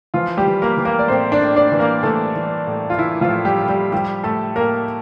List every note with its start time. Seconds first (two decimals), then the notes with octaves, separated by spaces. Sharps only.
0.14 E3 F3 F4
0.37 G3 G4
0.46 E3
0.62 A#3 A#4
0.77 E3
0.85 A#3 A#4
0.99 D5
1.08 A2 C4 C5
1.32 D4 D5
1.40 A2
1.56 D4 D5
1.72 E3
1.79 A#3 A#4
2.03 E3 A3 A4
2.36 E3
2.67 A2
2.90 F4
2.98 E3 E4
3.21 F3 F4
3.29 A2
3.45 G3 G4
3.61 A2
3.68 G3 G4
3.92 F3 G3 G4
4.24 A2 A3 A4
4.55 A2 A#3 A#4